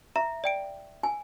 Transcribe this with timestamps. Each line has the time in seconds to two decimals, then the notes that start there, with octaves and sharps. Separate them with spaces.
0.16 E5 A#5
0.44 D5 G5 D7
1.03 G#5